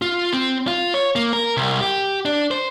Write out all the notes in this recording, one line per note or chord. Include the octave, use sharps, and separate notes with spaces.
F4
C4
F4
C#5
A#3
A#4
C2
G4
D4
C5